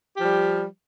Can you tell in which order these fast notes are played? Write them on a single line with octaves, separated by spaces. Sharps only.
G4 F3 G3